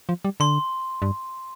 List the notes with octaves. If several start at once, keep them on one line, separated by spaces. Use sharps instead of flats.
F3
G3
D3 C6
G2